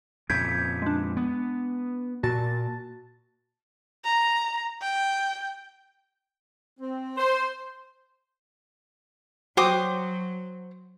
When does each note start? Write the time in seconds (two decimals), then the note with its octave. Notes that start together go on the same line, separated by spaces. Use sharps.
0.30 F2 A#2 C#3 G6 G#6 B6
0.82 G#3 D4
1.17 B3
2.23 A#2 F#4 A5 A6
4.04 A#5
4.82 G5
6.80 C4
7.17 C5
9.57 F#3 F#4 C5 G5 D6 D#6